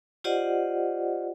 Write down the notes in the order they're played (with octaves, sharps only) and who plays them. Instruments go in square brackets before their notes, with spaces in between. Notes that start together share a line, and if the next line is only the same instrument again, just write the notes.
[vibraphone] F4 G4 C5 D5 D#5 F#5